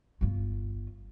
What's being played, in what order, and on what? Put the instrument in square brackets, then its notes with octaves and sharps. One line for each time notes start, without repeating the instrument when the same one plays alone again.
[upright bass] G1 F4